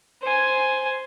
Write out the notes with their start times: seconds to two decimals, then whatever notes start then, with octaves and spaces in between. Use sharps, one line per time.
0.22 C5 G#5